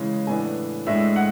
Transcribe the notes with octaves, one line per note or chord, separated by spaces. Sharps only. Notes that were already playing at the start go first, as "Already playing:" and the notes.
Already playing: C#3 E3 G#3
A2 E3 B3 D4 G#5
A2 G#3 D4 E5
F#5